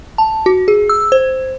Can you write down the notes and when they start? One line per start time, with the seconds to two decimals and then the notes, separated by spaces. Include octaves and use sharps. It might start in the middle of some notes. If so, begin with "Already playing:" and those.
0.18 A5
0.46 F#4
0.68 G#4
0.89 E6
1.12 C5